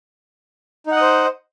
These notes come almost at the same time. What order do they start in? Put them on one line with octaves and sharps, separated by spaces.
D#4 F#5 D#5 C5